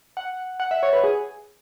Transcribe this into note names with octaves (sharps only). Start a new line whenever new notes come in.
F#5
F#5
E5
C#5
B4
G#4